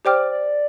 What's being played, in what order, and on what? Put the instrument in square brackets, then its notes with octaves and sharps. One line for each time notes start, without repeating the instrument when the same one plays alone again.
[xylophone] G4 C5 G5 D6 F6 [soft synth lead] D5
[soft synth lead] D5